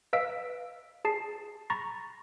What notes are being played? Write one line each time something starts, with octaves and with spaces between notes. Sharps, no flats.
B4 D#5 F5 E6 B6 D7
G#4 A5 C7
A#5 B5 C#6 A6 A#6